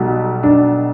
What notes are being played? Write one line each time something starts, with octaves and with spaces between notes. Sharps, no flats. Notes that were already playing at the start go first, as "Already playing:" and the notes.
Already playing: B1 B2 G3
D4